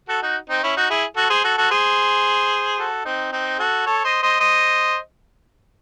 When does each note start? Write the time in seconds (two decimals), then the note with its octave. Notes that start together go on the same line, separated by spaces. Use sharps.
0.08 F#4 A4
0.22 D#4 F#4
0.50 C4 D#4
0.63 C#4 E4
0.76 D#4 F#4
0.90 E4 G#4
1.16 F#4 A4
1.30 G#4 C5
1.44 F#4 A4
1.58 F#4 A4
1.71 G#4 C5
2.78 F#4 A4
3.05 C4 D#4
3.32 C4 D#4
3.59 F#4 A4
3.86 A4 C#5
4.04 C5 D#5
4.23 C5 D#5
4.40 C5 D#5